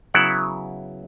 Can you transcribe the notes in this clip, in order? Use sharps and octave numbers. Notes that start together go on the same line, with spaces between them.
C#3 F#3 B3 E4 F#5